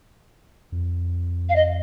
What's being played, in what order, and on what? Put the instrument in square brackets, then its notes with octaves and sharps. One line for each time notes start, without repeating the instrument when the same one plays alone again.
[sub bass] F2
[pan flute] F5
D#5